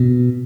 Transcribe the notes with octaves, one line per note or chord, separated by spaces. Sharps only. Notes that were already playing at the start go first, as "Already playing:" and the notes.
Already playing: B2